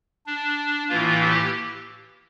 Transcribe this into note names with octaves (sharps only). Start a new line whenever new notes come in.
D4
A2 E3 A#3 F4
G4